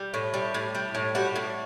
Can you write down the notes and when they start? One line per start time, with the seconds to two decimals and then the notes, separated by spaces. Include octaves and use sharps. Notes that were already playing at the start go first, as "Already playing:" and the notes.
Already playing: G3
0.14 A2
0.34 G3
0.54 A2
0.75 G3
0.95 A2
1.15 G3 F#4
1.36 A2